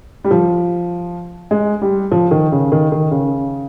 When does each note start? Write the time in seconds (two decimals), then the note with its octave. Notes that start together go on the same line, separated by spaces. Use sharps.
0.24 G3
0.31 F3
1.51 G#3
1.82 G3
2.11 F3
2.31 D#3
2.52 C#3
2.72 D#3
2.92 D#3
3.11 C#3